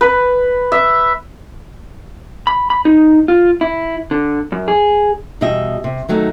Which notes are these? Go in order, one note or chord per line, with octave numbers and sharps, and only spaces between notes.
B4
E5
B5
B5
D#4
F4
E4
D3
F#2
G#4
E2 B2 G3 G4 D#5 E5
C3
D#3 F#3 A3 D#4